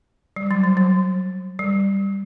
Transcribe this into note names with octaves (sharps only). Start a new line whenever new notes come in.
G3
F#3
F#3
F#3
G3